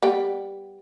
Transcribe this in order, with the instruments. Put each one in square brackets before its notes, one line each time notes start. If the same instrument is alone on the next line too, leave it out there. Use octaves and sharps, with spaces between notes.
[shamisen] G3 B3 G5